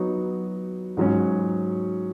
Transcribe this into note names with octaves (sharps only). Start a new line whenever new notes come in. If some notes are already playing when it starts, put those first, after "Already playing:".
Already playing: F#3 B3 D#4 F#4 C#5
G#2 F#3 C#4